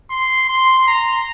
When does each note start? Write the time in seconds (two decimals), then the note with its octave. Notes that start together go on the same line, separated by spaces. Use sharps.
0.10 C6
0.49 C6
0.87 A#5